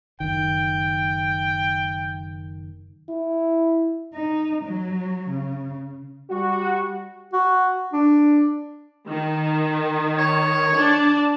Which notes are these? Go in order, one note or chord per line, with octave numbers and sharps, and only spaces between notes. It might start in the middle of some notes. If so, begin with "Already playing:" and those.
F#1 D#3 G5
E4
D#4
F#3
C#3
G3 F#4
F#4
D4
D#3
C#5
D4 D5 A5